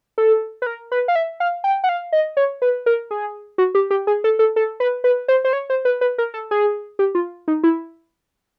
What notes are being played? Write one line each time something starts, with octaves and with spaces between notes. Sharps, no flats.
A4
B4
A#4
B4
F5
E5
F5
G5
F#5
F5
D#5
C#5
B4
A#4
G#4
F#4
G4
G4
G#4
A4
A4
A4
B4
B4
C5
C5
C#5
C5
B4
B4
A#4
A4
G#4
G4
F4
D#4
E4